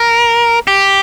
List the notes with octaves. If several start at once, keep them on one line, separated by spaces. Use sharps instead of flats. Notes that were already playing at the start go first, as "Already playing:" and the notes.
Already playing: A#4
G4